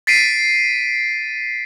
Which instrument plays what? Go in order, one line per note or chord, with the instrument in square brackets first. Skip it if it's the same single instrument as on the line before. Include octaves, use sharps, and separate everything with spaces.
[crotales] A6 B6 C7 D7 D#7